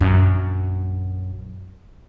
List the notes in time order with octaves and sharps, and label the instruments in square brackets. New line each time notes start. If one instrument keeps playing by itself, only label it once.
[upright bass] A#1 F#2